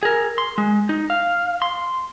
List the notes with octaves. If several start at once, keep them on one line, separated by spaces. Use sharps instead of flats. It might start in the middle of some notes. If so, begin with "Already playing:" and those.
G#4 A#4
C6
G#3
D#4
F5
C6